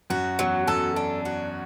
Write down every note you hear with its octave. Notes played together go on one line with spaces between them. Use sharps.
F#2 F#4
E2 F#3
F#2 A4
D4
F#4